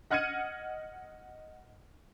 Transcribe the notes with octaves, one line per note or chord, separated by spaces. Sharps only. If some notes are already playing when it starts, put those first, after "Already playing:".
D#5 F#5 F6 G#6 C#7 D#7